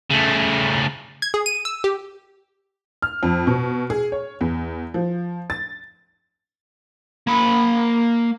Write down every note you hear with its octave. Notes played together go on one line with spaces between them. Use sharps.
C#3 A3
G#6
G#4
D#7
E6
G4
F6
F2
B2
G#4
C#5
E2
F3
A6
A#3 B5